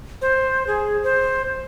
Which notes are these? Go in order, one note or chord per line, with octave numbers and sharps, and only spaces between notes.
C5
G#4
C5